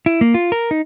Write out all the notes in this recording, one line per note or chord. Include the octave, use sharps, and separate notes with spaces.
E4
A#3
F4
A#4
D#4